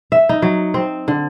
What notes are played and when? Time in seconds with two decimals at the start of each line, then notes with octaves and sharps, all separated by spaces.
0.12 E5
0.29 D#4
0.42 F#3
0.74 C4
1.08 D3